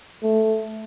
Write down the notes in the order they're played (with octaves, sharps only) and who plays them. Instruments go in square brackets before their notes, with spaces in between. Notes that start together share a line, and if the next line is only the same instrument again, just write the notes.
[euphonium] A3